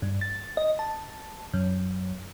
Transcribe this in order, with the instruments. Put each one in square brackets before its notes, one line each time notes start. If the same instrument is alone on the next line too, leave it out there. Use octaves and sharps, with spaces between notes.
[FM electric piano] G2
A6
D#5
A5
F#2